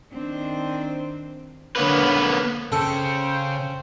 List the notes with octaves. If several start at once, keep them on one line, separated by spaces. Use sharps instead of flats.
D#3 C4 D4
D3 A#3 B3 B4 C#5
C#3 C#4 A4 C5 G5